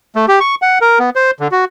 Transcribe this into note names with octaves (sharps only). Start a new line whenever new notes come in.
A3
G4
C#6
F#5
A#4
B3
C5
D3
F#4